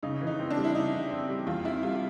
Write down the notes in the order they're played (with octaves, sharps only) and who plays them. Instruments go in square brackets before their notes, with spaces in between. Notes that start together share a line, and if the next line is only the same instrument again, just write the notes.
[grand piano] C#3 [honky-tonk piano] D#4
[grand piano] E3
[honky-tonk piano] D#4
[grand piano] C4
[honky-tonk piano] D4
[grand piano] G3
[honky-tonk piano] E4
[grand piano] C#3 [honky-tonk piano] D#4
[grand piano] E3
C4
G3
[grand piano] E2 [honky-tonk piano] F4
[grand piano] C3 [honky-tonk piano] E4
[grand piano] G3 [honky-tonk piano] F4